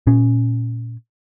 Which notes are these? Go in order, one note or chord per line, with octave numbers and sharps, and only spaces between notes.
A#2 C#4